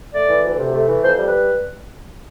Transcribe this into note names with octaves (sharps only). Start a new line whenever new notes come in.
A3 D5
E3
D2
C3
A3
E3
F2 C5
G3
B4